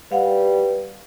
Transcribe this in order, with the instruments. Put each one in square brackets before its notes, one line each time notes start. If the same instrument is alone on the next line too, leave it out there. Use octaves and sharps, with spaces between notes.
[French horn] G3 [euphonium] B4 [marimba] F5 F#5